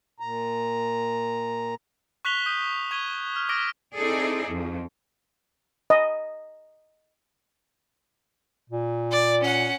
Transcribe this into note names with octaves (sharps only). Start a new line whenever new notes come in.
A#2 A#5
C#6 F#6 B6 F7 G7
D#6 F#6 G6 D#7
C#6 G#6 D#7 G7
F6
D6 D#6 F6 A#6 D7
C4 D#4 E4 G#4 A4 D5
F2
D#5
A#2
D5
C#4 F#5